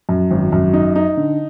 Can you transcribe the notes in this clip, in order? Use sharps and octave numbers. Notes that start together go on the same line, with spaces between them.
F#2
G#1
F#2
D#4
D#4
D3